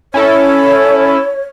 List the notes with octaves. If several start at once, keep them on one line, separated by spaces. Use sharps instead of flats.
C#4 E4 A4 C#5